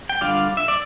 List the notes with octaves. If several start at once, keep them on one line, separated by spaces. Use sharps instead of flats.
G5
D3 G3 D4 F4 D5 F5
E5
D5